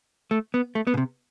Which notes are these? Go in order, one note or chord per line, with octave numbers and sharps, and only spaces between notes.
A3
B3
A3
B3
B2
C3